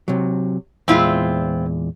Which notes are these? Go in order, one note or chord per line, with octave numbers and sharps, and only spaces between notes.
C3 F#3
E2 A#2 G#3 C4 E4 F4